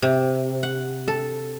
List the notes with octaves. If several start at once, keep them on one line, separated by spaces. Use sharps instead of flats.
C3
F#5
A4